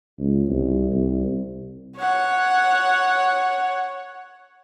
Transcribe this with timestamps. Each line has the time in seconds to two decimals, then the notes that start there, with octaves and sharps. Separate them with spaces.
0.18 C#2
0.49 C2
0.92 C2
1.98 C#5 F#5